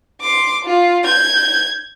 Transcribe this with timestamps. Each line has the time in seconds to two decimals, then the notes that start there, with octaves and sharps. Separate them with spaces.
0.21 C6 D6
0.65 F4
1.04 G6 G#6